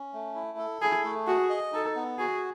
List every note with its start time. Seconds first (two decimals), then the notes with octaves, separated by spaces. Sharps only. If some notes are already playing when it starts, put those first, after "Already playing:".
Already playing: C#4
0.13 A3
0.35 E4
0.58 A4
0.81 E4 G#4
1.04 A3
1.27 F#4 G#4
1.50 D#5
1.73 D#4 A4
1.96 B3
2.19 F#4 G#4